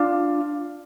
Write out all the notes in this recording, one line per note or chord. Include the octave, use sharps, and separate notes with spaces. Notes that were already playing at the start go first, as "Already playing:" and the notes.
Already playing: D4 F4